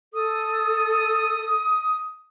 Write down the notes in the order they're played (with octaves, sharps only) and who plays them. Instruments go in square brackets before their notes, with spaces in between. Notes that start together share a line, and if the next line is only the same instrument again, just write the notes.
[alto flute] A4 [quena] D#6